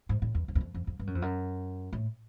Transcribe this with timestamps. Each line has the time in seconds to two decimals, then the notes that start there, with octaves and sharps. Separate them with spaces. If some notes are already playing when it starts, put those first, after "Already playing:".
0.09 G#2
0.22 A2
0.35 E2
0.48 F2
0.55 E2
0.61 F2
0.74 F2
0.87 F2
0.99 G2
1.07 F#2
1.15 F2
1.22 F#2
1.93 A2